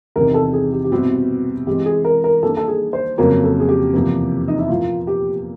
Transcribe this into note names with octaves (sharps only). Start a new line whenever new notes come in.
E2 C3 D#3 A#4
A4
G#4
G4
G4
B2 G3 C4 E4 F#4
E3 G#3 C4 G4
G#4
A#4
A#4
D#3 G3 A#3 D4 A4
A4
G#4
C5
F2 C#3 F#3 A#3 A#4
A4
G#4
G4
E2 C3 F3 A#3
D#4
E4
A#2 F3 A#3 F4
G4